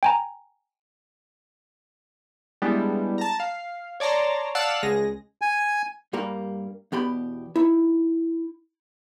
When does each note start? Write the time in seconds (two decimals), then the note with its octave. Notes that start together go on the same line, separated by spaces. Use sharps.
0.03 G5 G#5 A#5
2.62 G3 G#3 B3 D4 E4
3.18 A5 A#5
3.40 F5
4.00 C#5 D5 A5 A#5 C6
4.55 D5 F5 F#5 A5 E6 F#6
4.83 C#2 G#3 G#4 A#6
5.42 G#5
6.13 G2 G3 A#3 A#4
6.92 E2 B2 G4 B5
7.56 D#4 E4